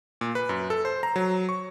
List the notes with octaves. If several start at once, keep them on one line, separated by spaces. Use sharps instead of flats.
A#2
B4
F#2
A4
C5
A#5
F#3
C#6